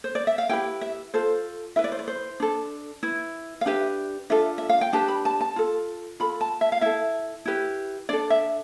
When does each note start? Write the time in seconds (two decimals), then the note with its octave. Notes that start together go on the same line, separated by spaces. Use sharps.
0.04 C5
0.15 D5
0.27 E5
0.38 F5
0.49 E4 G4 B4 G5
0.81 E5
1.14 F4 A4 C5
1.76 E4 B4 E5
1.84 D5
1.92 C5
1.99 D5
2.08 C5
2.40 D4 A4
3.03 E4 B4
3.61 F5
3.66 D4 G4 B4 E5
4.30 D4 F4 A4 E5
4.58 E5
4.69 F5
4.81 G5
4.93 D4 G4 B4 A5
5.08 B5
5.25 A5
5.41 A5
5.56 F4 A4
6.20 F4 A4 B5
6.41 A5
6.61 E5
6.72 F5
6.81 E4 A4 E5
7.45 E4 G4 B4
8.09 D4 A4 D5
8.30 E5